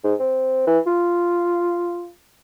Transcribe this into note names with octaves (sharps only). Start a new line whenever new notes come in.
G#2
C4
E3
F4